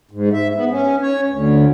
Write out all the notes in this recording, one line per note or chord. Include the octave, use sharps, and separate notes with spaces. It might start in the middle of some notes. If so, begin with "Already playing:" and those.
G#2
E5
B3
C#4
C#5
D2